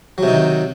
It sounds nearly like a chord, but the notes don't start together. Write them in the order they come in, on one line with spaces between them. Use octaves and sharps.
F#3 C3 D#4 D#3